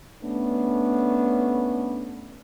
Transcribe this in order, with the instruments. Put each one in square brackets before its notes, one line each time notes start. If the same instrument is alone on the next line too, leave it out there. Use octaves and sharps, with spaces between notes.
[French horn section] A3 B3 C#4 D4